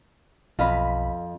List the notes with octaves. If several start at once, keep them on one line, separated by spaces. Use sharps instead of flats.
B1 F2 D#5 F5 B5